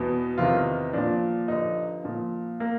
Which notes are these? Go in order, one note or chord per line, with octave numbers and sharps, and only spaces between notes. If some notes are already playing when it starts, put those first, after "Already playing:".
Already playing: E2 B2
E2 C3 D#3 F4
A#2 F3 D4
G2 D3 F3 D#4
A#2 F3
A#3